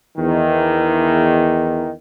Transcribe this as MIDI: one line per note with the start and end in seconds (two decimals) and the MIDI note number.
0.17 1.91 40
0.17 1.91 51
0.17 1.91 52